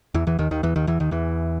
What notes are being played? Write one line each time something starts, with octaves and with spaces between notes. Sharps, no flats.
E2 E3
E2 E3
D#2 D#3
D#2 D#3
E2 E3
D#2 D#3
E2 E3
D#2 D#3
E2 E3